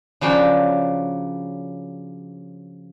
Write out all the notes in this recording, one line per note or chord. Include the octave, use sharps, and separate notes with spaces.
C#3 F3 F#3 D4 G5